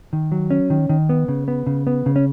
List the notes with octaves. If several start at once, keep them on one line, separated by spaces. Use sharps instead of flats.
D#3
F#3
C#4
D#3
D#3
B3
C#3
B3
C#3
B3
C#3
C#4